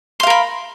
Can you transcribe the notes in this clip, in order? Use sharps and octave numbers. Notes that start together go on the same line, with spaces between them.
A#4 F5 B5 C6